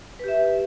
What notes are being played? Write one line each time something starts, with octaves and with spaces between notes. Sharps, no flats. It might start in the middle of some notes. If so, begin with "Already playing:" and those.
G4 B4 E5